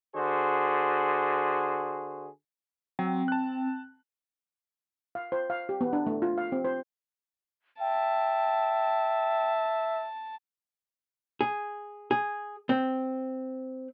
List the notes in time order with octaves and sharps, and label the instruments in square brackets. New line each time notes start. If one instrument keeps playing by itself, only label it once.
[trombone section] D3 F#4 G#4 C5
[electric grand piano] F#3 [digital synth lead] C4
[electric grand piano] A5 F#6
[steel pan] F5
C5
F5
G4
B3
D4
A3
F4
F5
C4
C5
[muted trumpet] E5 [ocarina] G5 [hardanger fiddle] A5
[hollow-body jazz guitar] G#4
G#4
C4